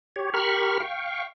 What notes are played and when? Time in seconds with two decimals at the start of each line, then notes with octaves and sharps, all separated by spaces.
0.16 G4 C#5
0.34 G4 A#4 B5 C#6 F6
0.80 F5 G5 C#6